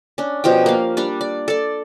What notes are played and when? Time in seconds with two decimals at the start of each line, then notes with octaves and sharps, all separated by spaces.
0.18 C#4 D4
0.44 B2 F3 G4 G5
0.66 A#3 F5
0.97 G3 D4 D5
1.21 D5
1.48 A4 D5